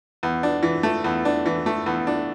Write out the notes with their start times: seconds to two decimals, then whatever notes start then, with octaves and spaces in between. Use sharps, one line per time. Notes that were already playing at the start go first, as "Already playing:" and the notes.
0.23 E2
0.43 D4
0.63 E3
0.83 A3
1.04 E2
1.25 D4
1.46 E3
1.66 A3
1.86 E2
2.07 D4